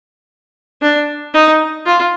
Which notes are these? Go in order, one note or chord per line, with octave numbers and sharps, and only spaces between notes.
D4
D#4
F4